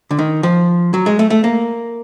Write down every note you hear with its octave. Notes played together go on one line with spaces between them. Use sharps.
D3
D#3
F3
F#3
G#3
A3
A3
A#3